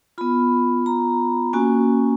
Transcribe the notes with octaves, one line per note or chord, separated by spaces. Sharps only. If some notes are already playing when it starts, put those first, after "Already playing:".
B3 F4 B5
A#5
A#3 C#4 F#4 G#5